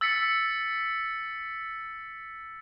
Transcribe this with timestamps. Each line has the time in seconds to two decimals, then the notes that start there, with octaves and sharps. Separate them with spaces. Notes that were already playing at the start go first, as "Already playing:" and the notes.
0.01 E6 A6 B6 C#7